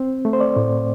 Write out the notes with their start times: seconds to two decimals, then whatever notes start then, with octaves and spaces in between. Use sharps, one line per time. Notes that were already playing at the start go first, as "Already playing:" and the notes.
Already playing: C4
0.25 A3
0.33 C5
0.40 D5
0.56 A2